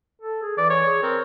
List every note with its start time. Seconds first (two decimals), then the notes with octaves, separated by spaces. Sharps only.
0.21 A4
0.42 G#4
0.58 E3 D5
0.70 C#5
0.84 G#4
1.03 C4 A#4